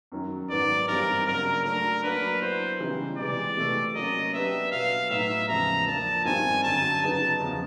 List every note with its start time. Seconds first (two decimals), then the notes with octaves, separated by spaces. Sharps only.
0.12 F#2 D#3 F#3
0.50 G#2 D#3 F#3 B3 D5
0.88 G2 E3 G3 C4 D#4 A#4
1.26 C#3 F#3 A#3 D4 A#4
1.65 F#3 A3 D4 A#4
2.03 F#3 A#3 D4 B4
2.42 F#3 B3 E4 C5
2.80 C#3 E3 G3 B3 D#4
3.18 C3 E3 G#3 D5
3.57 C3 E3 A3
3.95 F#3 A#3 C#4 D#5
4.33 F#3 B3 D4 G4 E5
4.72 B2 F#3 B3 F5
5.10 A2 F#3 B3 D#4 E5
5.48 E2 C#3 F3 G#3 B3 A#5
5.87 F3 A#3 D4 A5
6.25 G2 D#3 G3 C4 D#4 G#5
6.64 F#2 D3 F#3 A5
7.02 C#3 F#3 B3 D#4 G#4 A5
7.40 E2 C#3 F3